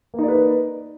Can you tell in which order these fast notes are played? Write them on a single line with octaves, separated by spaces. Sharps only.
A#3 D#4 D5 B4